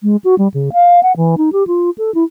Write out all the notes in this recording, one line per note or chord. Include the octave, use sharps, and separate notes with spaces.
G#3
F#4
G3
C#3
F5
F#5
E3
D#4
G4
F4
A4
E4